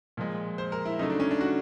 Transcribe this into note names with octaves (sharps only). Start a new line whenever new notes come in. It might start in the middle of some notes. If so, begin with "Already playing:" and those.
A#2 F3 G#3
C5
A#4
E4
C#3 F#3 A3 D#4
D4
C#4
D4
F#4